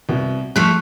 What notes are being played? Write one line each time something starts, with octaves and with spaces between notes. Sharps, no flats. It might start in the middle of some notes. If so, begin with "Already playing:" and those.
C2 B2
F3 A3 C#6 F#6